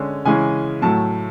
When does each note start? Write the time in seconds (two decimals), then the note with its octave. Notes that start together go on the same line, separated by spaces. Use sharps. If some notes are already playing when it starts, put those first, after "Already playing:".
Already playing: D3 G#3 C#4
0.25 C#3 E3 G#3 C#4 G#5
0.82 A2 F#3 A3 A5